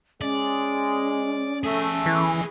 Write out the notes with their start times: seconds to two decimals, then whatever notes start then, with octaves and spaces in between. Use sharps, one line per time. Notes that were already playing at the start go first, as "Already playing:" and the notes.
0.21 G#3 C#4 D5
1.64 A3 G#4 E5
2.06 E3